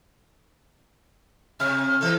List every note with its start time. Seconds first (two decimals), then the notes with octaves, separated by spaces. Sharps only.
1.60 C3 F6
2.01 E3 A4